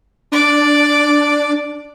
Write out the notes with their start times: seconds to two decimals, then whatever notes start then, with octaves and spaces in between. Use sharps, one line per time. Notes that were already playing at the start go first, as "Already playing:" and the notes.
0.32 D4 D5 D6